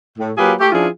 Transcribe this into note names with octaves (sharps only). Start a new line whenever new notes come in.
A2
F#3 A#3 F4 G4 G#4 B4
A3 G4
F3 C#4 D4 E4 F4 G#4